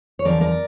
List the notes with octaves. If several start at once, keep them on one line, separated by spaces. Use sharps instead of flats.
C#5
E2 D3 F3 A#4 D5
A#4 D5